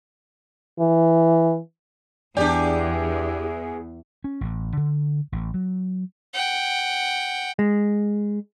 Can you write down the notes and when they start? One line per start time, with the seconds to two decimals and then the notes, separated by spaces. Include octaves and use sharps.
0.80 E3
2.37 E2 D4 G4 G#4 D5
4.24 C#4
4.41 A1
4.77 D3
5.32 A1
5.54 F#3
6.34 F#5 G5
7.59 G#3